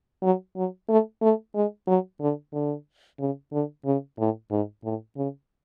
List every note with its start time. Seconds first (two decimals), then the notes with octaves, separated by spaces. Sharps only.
0.23 F#3
0.56 F#3
0.89 A3
1.22 A3
1.55 G#3
1.87 F#3
2.21 D3
2.53 D3
3.19 C#3
3.52 D3
3.85 C#3
4.18 A2
4.51 G#2
4.84 A2
5.17 C#3